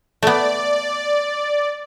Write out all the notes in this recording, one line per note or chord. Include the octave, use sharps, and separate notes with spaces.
A3 B3 D5